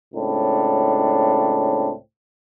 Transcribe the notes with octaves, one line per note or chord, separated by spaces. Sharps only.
C#2 A2 C4 D4